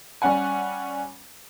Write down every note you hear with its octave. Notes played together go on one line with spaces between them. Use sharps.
G3 C#4 F#5 G#5